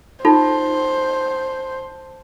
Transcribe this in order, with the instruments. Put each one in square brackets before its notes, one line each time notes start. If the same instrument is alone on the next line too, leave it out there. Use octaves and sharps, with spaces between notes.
[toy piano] D#4 F4 A4 [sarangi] C5 [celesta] A5